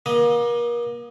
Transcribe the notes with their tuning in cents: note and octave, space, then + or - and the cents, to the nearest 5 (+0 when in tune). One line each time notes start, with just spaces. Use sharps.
A#3 +35 D#5 +0